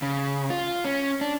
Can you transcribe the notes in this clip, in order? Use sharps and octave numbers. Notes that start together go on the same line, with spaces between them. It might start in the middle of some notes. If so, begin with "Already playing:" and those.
C#3
F4
C#4
D4